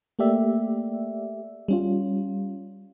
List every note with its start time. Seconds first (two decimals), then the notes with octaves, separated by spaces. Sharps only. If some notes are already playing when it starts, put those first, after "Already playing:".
0.19 A3 A#3 G4 D5 E5
1.68 G3 C#4 F4